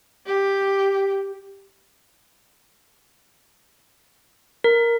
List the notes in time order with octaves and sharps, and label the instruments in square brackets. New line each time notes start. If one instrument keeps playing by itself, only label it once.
[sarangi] G4
[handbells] A#4